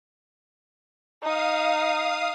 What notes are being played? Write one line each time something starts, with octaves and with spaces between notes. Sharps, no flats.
D#4 F5 D#6